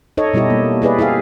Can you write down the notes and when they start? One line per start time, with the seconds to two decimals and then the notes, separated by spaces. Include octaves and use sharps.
0.17 D#4 A4 C#5 D#5
0.33 B2 G3 E4 G4 D#5
0.50 A#3
0.82 E4 G#4 B4 D5
0.99 E4 G4 G#4 F5